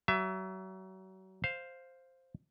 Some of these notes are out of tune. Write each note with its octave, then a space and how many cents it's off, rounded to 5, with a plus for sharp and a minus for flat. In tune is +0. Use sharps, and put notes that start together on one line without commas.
F#3 +35 E5 +25
C5 +0 F5 +0